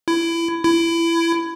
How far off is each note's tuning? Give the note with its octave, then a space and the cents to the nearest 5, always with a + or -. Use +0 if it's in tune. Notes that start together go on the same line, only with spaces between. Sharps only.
E4 +20
E4 +20